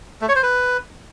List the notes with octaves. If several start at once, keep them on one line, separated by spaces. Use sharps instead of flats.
A3
C#5
C5
B4